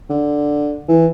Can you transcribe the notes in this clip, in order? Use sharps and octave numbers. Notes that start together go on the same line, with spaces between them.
D3
E3